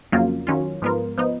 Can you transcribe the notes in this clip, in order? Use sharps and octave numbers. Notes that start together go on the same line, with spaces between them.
F2 C#3 F#3 A#3 F4
D#3 F#3 C#4 F4
G#2 F3 B3 F4 A#4
F3 B3 D#4